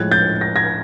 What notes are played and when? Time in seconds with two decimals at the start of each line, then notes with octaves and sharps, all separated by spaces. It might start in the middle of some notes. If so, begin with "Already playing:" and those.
Already playing: A2 F3 G#3 F#6 G#6
0.11 G6 A6
0.41 A#6
0.56 G#6 A#6